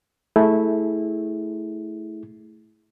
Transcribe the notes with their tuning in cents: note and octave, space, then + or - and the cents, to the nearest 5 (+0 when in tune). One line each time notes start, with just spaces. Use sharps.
A3 +0 E4 -15 G#4 +0